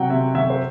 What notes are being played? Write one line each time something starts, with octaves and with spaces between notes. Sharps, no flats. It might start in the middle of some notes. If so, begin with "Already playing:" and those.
Already playing: C3 F#3 F#5 G5
C3 E5
F#3 E5
C5